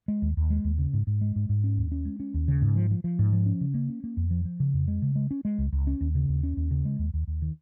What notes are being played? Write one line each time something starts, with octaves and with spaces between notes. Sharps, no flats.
G#3
D#2
D#2
G#3
D#2
C#3
G#2
G#2
G#3
G#2
G#2
C#4
D#2
C#4
G#3
C#4
D#2
C#3
G#2
F3
F3
F3
G#2
F3
C#4
C#3
A#3
C#4
A#3
F2
F3
F3
C#3
F2
G#3
C#3
G#3
C#4
G#3
C#2
C#2
C#4
D#2
C#3
D#2
C#4
D#2
C#3
G#3
D#2
D#2
D#2
D#3